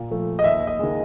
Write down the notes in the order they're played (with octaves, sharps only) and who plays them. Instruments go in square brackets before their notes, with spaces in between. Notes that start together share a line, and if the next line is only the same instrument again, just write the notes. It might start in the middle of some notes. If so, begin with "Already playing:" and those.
Already playing: [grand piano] A#2
F3 A3
D#5
D#2 E5
D#5
D#3 G#3